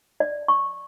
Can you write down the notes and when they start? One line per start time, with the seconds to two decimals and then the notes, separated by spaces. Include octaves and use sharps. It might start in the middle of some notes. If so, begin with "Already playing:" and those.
0.20 D5
0.48 C#6